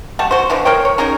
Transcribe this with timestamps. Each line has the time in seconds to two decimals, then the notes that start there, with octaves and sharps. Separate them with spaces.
0.19 G3 A3 F#5 A5
0.31 F#4 C5
0.50 B2 D3 E3 F3
0.65 A#4 C5 C#5 G5
0.85 C#5
0.98 C#4 D#4 G#4 A#4